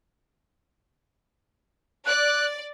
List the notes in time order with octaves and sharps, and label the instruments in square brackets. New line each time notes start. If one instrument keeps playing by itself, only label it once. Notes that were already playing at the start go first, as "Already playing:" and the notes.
[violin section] D5 [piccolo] F#6